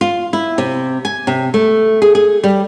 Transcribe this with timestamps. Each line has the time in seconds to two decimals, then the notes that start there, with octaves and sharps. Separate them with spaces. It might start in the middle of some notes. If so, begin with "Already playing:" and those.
0.01 F4
0.33 E4
0.58 C3
1.05 G#5
1.27 C3
1.54 A3
2.02 G#4
2.15 G#4
2.44 G3